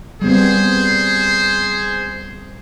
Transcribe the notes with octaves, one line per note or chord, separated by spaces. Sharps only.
G3 B3 C4 G#4 C5